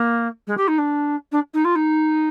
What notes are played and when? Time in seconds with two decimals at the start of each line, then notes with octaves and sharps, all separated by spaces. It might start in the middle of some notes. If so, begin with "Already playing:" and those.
Already playing: A#3
0.47 G#3
0.57 G4
0.68 D#4
0.78 D4
1.32 D4
1.54 D#4
1.65 F4
1.75 D#4